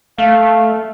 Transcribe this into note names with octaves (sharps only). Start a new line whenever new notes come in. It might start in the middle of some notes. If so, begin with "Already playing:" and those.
A3 F5